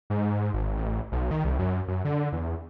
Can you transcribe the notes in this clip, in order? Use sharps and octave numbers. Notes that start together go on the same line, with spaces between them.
G#2
G#1
A1
B1
D#3
C2
F#2
F#2
D3
E2